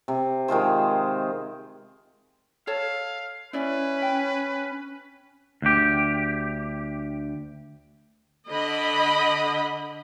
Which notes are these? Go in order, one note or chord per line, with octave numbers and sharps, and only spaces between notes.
C3
D#3 G#3 F4 C5
A4 C#5 F5 A5
C#4 E4 B4 D5
G5
D2 G4
D3 D#5 B5